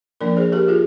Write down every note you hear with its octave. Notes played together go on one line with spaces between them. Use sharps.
F3 A#3 D4 A#4 D5
G#4 C5
G4 A#4
F4 G#4